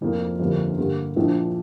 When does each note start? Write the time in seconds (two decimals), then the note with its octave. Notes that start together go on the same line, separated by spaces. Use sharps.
0.01 F1 F2 F3 A#3
0.39 G1 F2 D3 G3 A#3
0.77 G2 D3 A#3 G4
1.16 A#1 A#2 F3 D4